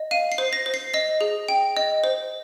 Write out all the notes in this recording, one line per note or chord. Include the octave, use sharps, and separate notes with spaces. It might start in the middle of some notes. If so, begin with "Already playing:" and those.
Already playing: D#5
F5 D#7
C7
C5
A#6
C5
C7
D#5 A#6
G#4
G5
D#5
C5